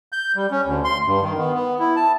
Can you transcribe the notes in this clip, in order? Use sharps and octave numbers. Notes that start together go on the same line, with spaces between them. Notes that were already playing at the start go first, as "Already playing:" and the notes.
G6
G3
C#4
D2
C6
G2
D#3
B3
B3
E4
A5